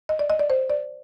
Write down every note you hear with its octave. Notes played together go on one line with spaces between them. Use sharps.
D#5
D5
D#5
D5
C5
D5